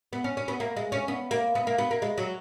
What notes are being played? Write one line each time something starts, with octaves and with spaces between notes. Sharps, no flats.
B3
C#4
C#4
B3
A#3
G#3
C#4
B3
A#3
B3
A#3
B3
A#3
G#3
F#3